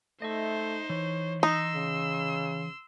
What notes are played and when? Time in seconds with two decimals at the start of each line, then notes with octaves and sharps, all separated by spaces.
0.22 A3 D#4 C5 D#5 E5
0.90 E3 C#5
1.43 D#4 C6 E6
1.75 C#3